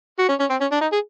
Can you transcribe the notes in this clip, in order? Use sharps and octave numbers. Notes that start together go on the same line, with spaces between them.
F#4
C#4
C#4
C4
C#4
D4
D#4
G#4